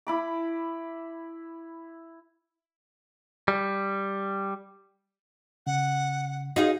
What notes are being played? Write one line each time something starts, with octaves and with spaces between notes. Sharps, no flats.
E4 B5 D6
G3
C#3 F#5
D#4 F4 F#4 G#4